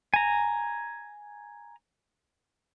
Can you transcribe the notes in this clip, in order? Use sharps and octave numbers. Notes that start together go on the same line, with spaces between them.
G#5 A#5